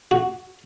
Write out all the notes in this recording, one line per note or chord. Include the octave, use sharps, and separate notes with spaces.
F#4